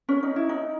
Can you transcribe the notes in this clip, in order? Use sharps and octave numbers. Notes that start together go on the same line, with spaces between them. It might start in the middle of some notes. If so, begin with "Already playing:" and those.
C#4
D#4
E4
D#4